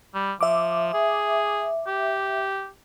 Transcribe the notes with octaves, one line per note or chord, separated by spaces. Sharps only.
G3
F3 E5 D6
G#4
G4